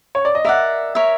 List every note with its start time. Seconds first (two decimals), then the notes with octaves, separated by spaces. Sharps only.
0.15 C#5
0.25 D5
0.35 D#5
0.45 A#4 D5 E5 F#5
0.95 A#4 C#5 E5